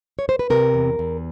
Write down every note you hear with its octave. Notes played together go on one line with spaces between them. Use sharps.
C#5
C5
B4
C3 A#4
E2
E2